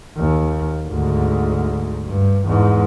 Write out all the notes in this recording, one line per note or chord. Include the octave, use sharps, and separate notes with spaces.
D#2
D2 G#2
G2
E2 G#2